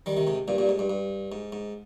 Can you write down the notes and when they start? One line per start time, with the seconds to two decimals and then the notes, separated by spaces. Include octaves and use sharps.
0.06 D#3 G3
0.17 C3 D#3
0.27 G#2 C3
0.48 G2 A#2
0.58 G2 A#2
0.69 G#2
0.79 G2
0.90 G2
1.32 G#2
1.52 G#2